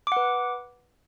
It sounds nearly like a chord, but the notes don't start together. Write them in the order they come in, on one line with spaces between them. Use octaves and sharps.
D6 F#5 B4